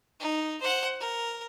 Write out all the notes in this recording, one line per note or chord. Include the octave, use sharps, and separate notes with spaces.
D#4
C5 F#5
A#4